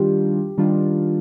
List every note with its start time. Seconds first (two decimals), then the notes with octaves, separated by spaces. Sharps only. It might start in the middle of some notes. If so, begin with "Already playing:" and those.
Already playing: D#3 G3 D4 F4 G4
0.58 D#3 G3 D4 F4